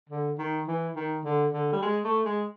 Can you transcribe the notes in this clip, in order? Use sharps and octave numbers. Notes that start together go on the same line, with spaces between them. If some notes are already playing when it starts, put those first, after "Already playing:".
D3
D#3
E3
D#3
D3
D3
G3
G#3
A3
G#3